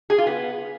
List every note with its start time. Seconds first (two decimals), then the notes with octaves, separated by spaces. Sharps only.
0.10 G#4
0.18 F4
0.27 B3